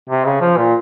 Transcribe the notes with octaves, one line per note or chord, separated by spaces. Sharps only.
C3
C#3
F3
A#2